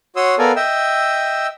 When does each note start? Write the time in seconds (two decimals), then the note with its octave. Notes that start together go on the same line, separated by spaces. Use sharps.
0.16 F#4 C#5 C6 D#6 E6
0.39 B3 A4 A#4 D5 F5 G#5
0.56 D#5 E5 G5 E6